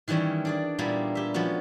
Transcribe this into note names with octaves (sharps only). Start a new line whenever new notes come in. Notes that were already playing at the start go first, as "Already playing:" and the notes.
D#3 E3 G3 C#4 C#5
D4 G#4 D5
A#2 G3 A#3 B3 E4 G#4
G4 E5
F3 G#3 B3 C#4 F#4